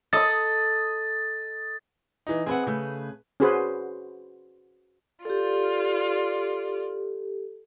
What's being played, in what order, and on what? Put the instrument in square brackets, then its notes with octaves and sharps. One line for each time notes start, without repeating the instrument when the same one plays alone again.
[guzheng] A4 [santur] D#5 D#6 [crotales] A6
[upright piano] E3 D#4
[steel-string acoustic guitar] C4 E5 F#5 [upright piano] G#4 B4
[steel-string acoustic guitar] C#3 A3
[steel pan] C#4 F#4 G#4 B4 C5
[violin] F4 D5 [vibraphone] G4 A4